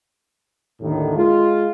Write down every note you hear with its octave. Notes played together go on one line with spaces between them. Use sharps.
D#2 A2 D3 D#3
G#3 F4